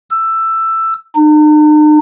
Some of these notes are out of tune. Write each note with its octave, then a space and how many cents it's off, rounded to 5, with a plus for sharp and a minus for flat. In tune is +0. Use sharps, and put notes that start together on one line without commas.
E6 +10
D#4 -45